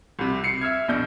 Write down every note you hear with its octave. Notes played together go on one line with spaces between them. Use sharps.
C2 C3
C7 C#7
E5 E6 F6 G#6
A#1 B2 D4 G6